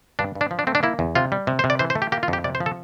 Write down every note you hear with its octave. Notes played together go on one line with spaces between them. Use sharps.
G2 D4
G2
D4
F3
D4
A3 C4
D4
A#3 E4
E2
C3 F4
G3
C3
C5
C3
D5
E3 C5
C5
A3
G4
A#3 G4
F4
F2
G4
C3 D5
C5
F3
A4